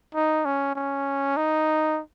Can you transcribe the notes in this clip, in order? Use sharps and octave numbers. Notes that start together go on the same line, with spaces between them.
D#4
C#4
C#4
D#4